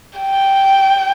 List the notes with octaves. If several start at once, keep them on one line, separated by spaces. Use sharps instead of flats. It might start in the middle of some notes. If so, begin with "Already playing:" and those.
G5